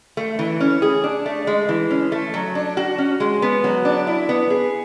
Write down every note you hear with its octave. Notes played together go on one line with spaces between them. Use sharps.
A3
E3
C#4
G#4
D4
A3
G#3
E3
C#4
A3
F#3
D4
F#4
C#4
G#3
B3
F#3
D4
E4
B3
G#4